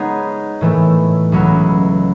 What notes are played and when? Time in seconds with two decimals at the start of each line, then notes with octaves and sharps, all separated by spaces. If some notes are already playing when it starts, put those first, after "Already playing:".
Already playing: G#3 B3 D#4 G#4 C#5
0.61 A2 E3 A3
1.32 C#2 B2 F#3 C#4 E4